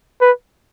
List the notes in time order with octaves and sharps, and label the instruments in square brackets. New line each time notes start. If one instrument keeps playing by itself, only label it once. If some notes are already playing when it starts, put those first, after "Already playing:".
[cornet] B4